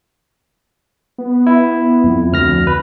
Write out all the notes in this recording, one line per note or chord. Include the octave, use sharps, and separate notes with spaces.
B3
E4
F2
D2 F6 A#6
B4